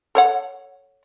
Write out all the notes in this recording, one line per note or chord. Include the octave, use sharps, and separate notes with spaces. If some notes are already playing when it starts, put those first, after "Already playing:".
A4 C#5 F#5